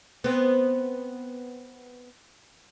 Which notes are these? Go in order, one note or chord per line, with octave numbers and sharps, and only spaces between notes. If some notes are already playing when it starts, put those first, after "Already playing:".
B3 C4